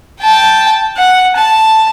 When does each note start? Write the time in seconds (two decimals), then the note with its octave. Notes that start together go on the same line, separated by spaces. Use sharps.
0.21 G5 A5
0.97 F#5
1.36 A5